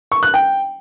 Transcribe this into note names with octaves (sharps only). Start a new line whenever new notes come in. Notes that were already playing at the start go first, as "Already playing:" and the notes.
C#6
F#6
G5